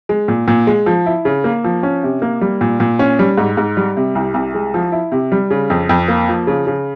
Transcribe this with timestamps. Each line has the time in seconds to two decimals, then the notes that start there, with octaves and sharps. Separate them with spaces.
0.09 G#3
0.28 A#2
0.48 A#2
0.67 G#3
0.86 F3
1.06 E4
1.25 C#3
1.44 A#3
1.64 F3
1.83 C#4
2.03 C3
2.22 A#3
2.41 G3
2.61 A#2
2.80 A#2
2.99 C#4
3.19 G3
3.38 G#2
3.57 G#2
3.77 G3
3.97 C3
4.15 C2
4.34 C2
4.54 G#3
4.74 F3
4.92 E4
5.12 C3
5.32 G3
5.50 C#3
5.70 F2
5.89 F2
6.08 A#3
6.28 F3
6.47 C#3
6.67 C#3